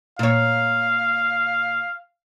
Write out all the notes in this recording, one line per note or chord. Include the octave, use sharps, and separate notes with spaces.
A#2 C#5 F5